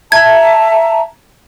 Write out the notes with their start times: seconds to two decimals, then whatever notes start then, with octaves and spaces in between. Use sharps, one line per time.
0.12 E5 A5 A#5 G#6